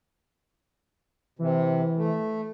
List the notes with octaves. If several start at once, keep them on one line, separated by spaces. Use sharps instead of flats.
C3 E3
A3